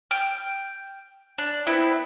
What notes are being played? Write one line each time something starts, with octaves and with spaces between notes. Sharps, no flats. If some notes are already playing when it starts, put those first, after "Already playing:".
G5 F6
D4
B3 C4 E4 B4